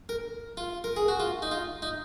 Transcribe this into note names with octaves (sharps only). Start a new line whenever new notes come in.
A#4
F4
A#4
G#4
F#4
F4
D#4
F4
D#4